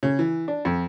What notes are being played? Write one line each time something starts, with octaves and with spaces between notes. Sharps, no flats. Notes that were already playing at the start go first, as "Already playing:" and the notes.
C#3
E3
D4
F2